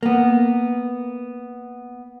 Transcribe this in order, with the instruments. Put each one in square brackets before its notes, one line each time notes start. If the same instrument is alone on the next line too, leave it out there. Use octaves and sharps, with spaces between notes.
[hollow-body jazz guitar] A#3 B3